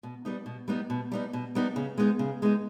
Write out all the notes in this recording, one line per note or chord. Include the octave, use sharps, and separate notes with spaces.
B2
G3 B3 D#4
B2
G3 B3 D#4
B2
G3 B3 D#4
B2
G3 B3 D#4
C#3
G#3 B3 D#4
C#3
G#3 B3 D#4